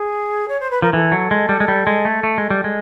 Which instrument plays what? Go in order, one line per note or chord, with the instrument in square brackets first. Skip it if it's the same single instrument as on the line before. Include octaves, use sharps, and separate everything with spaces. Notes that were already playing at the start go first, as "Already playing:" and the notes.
Already playing: [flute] G#4
C#5
C5
B4
[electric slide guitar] F3 [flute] A#4
[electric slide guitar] E3 [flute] A4
[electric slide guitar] F#3
G#3
G3
G#3
G3
G#3
A3
A3
G#3
G3
G#3